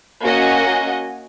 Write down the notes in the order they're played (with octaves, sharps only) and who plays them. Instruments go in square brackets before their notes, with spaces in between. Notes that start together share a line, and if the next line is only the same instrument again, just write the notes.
[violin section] A#3 C#4 F#4 D#5 F#5 G#5